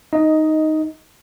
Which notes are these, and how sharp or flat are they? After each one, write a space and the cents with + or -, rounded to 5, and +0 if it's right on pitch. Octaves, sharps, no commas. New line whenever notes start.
D#4 +0 D#5 +10